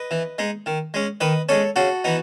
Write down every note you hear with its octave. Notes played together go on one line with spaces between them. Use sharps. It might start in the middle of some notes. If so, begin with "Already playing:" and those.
Already playing: B4 D#5
E3
G#3 D#4
D#3
G#3 C#4
D#3 B4 D#5
G#3 C#4 A4 C#5
C#3 F#4 A4
E3 B3 D#4